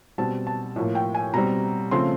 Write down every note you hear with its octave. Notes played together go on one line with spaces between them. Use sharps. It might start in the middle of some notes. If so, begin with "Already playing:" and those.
B2 G3 C4 A5
A5
A2 F3 A#3
G5
G#5
B2 G3 C4 A#5
C#3 F3 A3 C4 C6